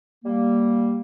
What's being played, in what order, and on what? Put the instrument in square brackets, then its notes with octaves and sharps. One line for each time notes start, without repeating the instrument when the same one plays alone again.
[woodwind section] G3 A#3